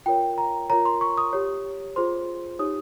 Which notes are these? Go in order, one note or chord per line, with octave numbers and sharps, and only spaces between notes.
F4 A#4 C#5 G5
A#5
F4 A#4 C#5 A#5
C6
C#6
D#6
G4 C#5
F4 G#4 C5 C6
D#4 G4 C#5 D#6